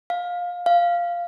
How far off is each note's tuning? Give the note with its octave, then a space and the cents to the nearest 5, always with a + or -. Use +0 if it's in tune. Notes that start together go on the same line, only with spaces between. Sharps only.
F5 +20
F5 -5